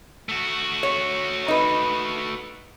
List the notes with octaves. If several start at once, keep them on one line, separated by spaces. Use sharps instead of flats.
A3 F#4
C#5
D#4 B4